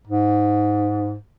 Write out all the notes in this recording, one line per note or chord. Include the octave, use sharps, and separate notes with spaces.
G#2